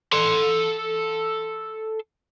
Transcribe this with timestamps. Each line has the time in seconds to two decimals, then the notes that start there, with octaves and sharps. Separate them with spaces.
0.13 A4 C6